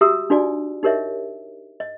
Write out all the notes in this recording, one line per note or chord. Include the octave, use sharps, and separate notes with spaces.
F#4 G4 E5 A#5 D#6 E6
D4 D#4 F4 F#4 D5 G#5
D#4 G4 A#4 C#5 D#5 E5
D#5